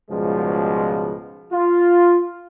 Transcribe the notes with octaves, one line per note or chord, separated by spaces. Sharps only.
C#2 G#2 B2 F3 G3 G#3
F4